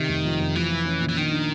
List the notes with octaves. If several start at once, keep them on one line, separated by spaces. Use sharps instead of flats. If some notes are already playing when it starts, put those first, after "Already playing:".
Already playing: C3 D#3
F1
F2
F2
E3 F3
F3
C#4
A#2
E3
D#3 D4
D4